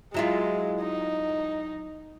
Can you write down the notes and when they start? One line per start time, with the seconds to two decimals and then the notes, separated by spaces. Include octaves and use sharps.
0.14 F#3 G#3 E4 F4
0.81 D#4